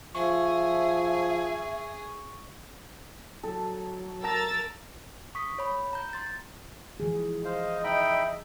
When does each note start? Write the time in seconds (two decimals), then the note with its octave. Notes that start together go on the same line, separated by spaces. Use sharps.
0.15 F3 G#4 E5 C#6
3.43 F#3 A4
4.24 A#4 A5 A#5 E6 A6
5.35 C#6 D#6 B6
5.59 C#5 B5
5.93 A#5 G6
6.13 C6 A6
7.00 E3 F3 G#4
7.45 C5 D#5 F5
7.84 D#4 E5 G5 B5